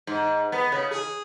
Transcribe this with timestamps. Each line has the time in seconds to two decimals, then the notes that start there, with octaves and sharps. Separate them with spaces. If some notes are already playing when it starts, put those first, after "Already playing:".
0.07 G#2
0.52 B3
0.72 C#3
0.91 G#4